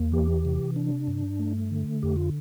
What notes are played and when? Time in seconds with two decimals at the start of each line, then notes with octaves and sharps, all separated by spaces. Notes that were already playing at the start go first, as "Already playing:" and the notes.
Already playing: E2 A#3
0.12 E3 G4
0.45 C3
0.76 D4
1.07 G2
1.39 A3
1.71 D3
2.02 F2 G4
2.16 F4